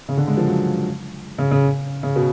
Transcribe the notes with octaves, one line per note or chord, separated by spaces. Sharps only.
C#3
D3
G#3
F3
F#3
C#3
C#3
C#3
B2